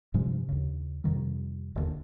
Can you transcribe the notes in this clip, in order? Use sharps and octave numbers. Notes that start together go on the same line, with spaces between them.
G2 C3 F3 G#3
D#2 C#3
F2 C3 D#3 G3
E1 D#2 D3